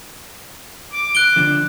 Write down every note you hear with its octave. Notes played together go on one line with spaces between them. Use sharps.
D6
F#6 D7 G7
D3 F3 D4